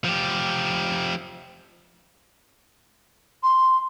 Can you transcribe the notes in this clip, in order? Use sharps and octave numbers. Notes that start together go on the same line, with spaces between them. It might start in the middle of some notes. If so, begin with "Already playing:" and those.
F3 G4
C6